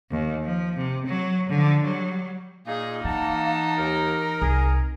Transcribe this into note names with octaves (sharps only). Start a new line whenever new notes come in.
D#2
F3
C3
F#3
D3 F3
F#3 G3
A#2 A#3 D#4 G#4
E3 D#4 F#5 A5
D#2 A#4
C2 G#4